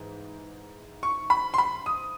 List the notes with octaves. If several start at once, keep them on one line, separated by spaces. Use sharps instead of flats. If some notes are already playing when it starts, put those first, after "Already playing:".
Already playing: G#2 E3
C#6
B5
C6
B5
D#6